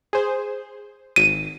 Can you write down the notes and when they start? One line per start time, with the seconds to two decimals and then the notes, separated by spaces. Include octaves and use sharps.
0.13 G#4 C5
1.16 G#1 D#7